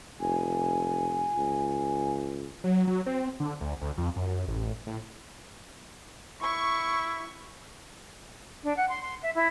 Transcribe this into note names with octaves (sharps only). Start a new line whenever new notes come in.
F1 G#5
C#2
F#3
F#3
C4
D3
D2
D2
F2
F#2
A1
A2
E4 C#6
D4
F#5
C6
C6
E5
E4